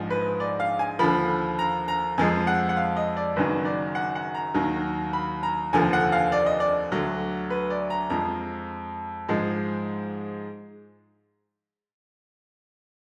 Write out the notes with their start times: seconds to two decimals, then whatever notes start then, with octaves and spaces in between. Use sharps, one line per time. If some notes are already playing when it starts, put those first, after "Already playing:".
Already playing: A#1 G#2 F3
0.10 B4
0.40 D5
0.60 F5
0.79 G#5
0.99 D#2 D3 F3 B5
1.59 A#5
1.88 A#5
2.18 F2 F3 G#3 G#5
2.47 F#5
2.69 F#5
2.77 F5
2.96 D#5
3.17 D5
3.36 F#1 F#2 D#3 F#3 B4
3.65 D5
3.95 F#5
4.15 F#5
4.34 A#5
4.54 D#2 D#3 F#3
5.13 B5
5.43 A#5
5.73 F1 D#2 D3 F3 G#5
5.93 F#5
6.12 F5
6.32 D5
6.46 D#5
6.60 D5
6.92 D2 D3 F#3
7.50 B4
7.70 D5
7.90 A#5
8.10 F2 F3 G#3 A#5
9.28 G#2 F3 G#3